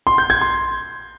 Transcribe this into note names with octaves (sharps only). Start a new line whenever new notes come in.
C6
G6
G#6
C6